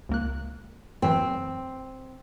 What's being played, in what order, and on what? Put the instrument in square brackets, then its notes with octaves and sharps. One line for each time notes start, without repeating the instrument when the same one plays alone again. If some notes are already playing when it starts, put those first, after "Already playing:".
[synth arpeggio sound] C#2 A#3 F#6
[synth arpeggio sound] F#2 E3 F#3 [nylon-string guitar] C4